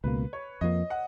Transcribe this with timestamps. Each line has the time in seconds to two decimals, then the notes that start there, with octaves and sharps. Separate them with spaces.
0.04 C#2 B2 A#3 B4
0.33 C#5
0.61 F2 F3 A#3 D#5
0.90 F#5